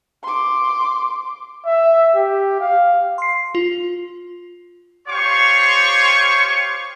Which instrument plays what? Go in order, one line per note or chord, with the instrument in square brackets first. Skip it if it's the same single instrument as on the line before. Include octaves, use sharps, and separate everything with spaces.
[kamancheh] C6 D6
[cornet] E5
G4
F5
[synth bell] C6 C7
F4
[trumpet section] F4 G4 C5 C#5 C6 C#6